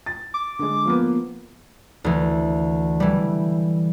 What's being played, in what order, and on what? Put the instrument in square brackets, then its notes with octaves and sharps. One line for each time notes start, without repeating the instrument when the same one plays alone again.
[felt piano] A6
[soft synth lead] D6
[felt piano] D3 G#3
F3 A#3 B3
[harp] D2 E3
E3 G3